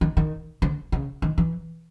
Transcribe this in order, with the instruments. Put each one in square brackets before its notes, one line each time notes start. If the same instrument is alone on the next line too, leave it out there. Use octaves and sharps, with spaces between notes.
[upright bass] D#3
D#3
D3
C#3
D#3
E3